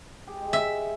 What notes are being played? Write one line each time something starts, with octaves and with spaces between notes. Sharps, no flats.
G4 G#4
G#3
E5